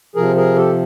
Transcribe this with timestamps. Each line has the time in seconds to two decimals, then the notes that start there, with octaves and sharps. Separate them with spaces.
0.16 C3 F3 G#4 A#4
0.36 G#4 A#4
0.56 G4 A4